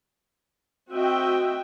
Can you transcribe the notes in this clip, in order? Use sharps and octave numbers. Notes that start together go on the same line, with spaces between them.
C4 F#4 D#5 E5 G5